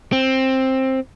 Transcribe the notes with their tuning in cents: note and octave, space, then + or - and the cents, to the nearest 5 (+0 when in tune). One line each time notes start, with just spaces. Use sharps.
C4 +10